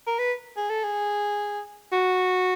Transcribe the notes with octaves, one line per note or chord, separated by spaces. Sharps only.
A#4
B4
G#4
A4
G#4
F#4